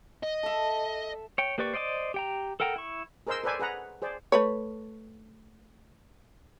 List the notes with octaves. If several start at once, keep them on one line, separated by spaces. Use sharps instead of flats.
D#5
A4 E5
C#5 G5
A#3 G4 B4 D5 C#6
C5 D5 D#5 F#5 D6
G4 G5 A#5
A4 A#4 F#5 G5 A#5
E4 C#6
G#4 A#4 C5 D#5 C6 E6
A4 B4 C5 D5 G#5 D6
G#4 B4 F#5 A#5
G#4 C5 D5
A3 B4 C#5